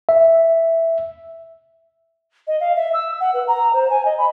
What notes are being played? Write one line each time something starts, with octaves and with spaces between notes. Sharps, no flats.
E5
D#5
F5
E5
E6
F#5
B4
A#5
C5
G#5
D#5
B5